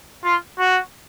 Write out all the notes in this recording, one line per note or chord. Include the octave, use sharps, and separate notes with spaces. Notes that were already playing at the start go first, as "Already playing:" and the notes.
F4
F#4